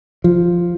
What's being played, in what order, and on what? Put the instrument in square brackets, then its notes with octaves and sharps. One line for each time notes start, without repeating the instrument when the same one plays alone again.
[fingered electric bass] F3